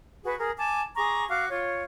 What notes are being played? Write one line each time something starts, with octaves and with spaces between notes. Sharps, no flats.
F#4 G#4 B4
G#4 A#4
G#5 A5 D6
G#4 A#5 C#6 D6
F#4 F5 D6
F4 C#5